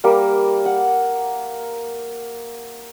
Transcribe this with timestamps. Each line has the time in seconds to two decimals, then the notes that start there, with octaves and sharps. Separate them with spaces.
0.04 G3 A#3 A#4
0.65 F#5